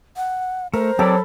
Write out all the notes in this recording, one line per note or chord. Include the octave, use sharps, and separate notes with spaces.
F#5
A3 A#4 C5
F#3 C4 G4 A4 D5 A5 B5